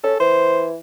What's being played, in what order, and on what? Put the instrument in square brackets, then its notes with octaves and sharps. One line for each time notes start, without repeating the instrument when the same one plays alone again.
[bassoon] C#4 [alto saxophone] A4
[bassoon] E3 [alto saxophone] C5